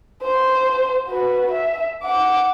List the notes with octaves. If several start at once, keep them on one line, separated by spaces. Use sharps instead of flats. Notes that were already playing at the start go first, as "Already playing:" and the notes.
C5
F#4 B4
E5
F#5 D6